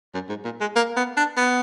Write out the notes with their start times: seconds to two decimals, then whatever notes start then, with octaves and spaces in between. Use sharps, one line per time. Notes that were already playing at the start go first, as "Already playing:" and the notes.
0.14 F#2
0.29 G#2
0.44 A#2
0.61 G#3
0.76 A#3
0.97 B3
1.17 D4
1.37 B3